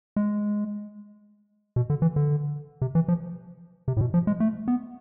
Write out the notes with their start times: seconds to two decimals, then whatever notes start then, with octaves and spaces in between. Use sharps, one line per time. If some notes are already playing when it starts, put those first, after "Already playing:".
0.16 G#3
1.76 B2
1.90 D3
2.02 E3
2.16 D3
2.82 C3
2.95 E3
3.08 F3
3.88 C3
3.97 A2
4.01 B2
4.14 F3
4.27 G#3
4.40 A3
4.68 B3